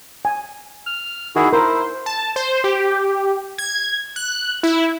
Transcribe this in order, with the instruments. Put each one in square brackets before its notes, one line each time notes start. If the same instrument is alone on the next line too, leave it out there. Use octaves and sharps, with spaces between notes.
[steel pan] G#5
[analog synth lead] F6
[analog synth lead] D#3 [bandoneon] E4 F#4 G#4
[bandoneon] E4 [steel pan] A#4 [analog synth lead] C5
[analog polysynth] A5
C5
G4
G#6
F#6
E4